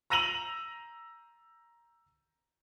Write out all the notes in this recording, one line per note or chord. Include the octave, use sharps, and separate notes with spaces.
A#5 E6 A#6 D#7 F7 F#7